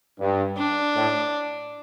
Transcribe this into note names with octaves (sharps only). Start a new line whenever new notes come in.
G2
D4
A2